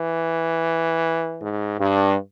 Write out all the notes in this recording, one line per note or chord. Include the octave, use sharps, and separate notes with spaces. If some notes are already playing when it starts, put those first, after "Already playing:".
Already playing: E3
G#2
G2